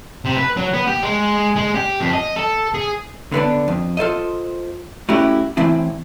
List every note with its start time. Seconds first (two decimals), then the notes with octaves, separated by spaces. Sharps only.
0.25 C3
0.37 B4
0.57 F#3
0.74 B3
0.87 G4
1.03 G#3
1.56 G#3
1.75 G4
2.01 F2
2.13 D#5
2.36 A4
2.74 G#4
3.32 D3 B3 C#4 D4
3.68 F2
3.97 F4 A4 C5 D#5
5.09 A3 C#4 E4 F#4 G4
5.57 A2 E3 C4 E4